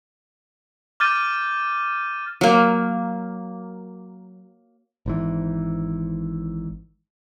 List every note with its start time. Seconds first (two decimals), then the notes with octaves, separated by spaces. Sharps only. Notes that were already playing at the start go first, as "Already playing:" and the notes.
1.00 D6 F6 G6 A6 D#7
2.41 F#3 A#3
5.06 G#1 G#2 E3